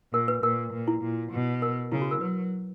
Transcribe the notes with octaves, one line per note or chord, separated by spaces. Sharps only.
A#2 A#4
B4
A#2 A#4
A#2
E4
A#2
B2
A#4
C#3 E4
F#4
A#4
F#3 B4